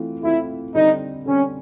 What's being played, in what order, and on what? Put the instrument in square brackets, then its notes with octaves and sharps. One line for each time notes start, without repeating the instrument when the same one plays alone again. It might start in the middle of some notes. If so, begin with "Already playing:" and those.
Already playing: [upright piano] E3 A3 C4 F4
[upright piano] E3 A3 C4 F4 [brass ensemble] E4
[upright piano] D3 G3 C4 [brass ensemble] D#4
[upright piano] D3 G3 C4 [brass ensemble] C#4